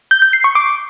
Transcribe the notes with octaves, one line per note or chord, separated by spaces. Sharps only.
G6
G6
C7
C#6
D6